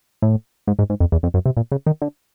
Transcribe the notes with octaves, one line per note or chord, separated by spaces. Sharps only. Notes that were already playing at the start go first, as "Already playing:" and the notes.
A2
G#2
G#2
G#2
F2
E2
F2
F#2
C3
A#2
C#3
D#3
D3